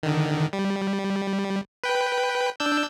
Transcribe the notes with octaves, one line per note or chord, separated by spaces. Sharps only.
D3 D#3
G3
B4 G5
D4 E6 G6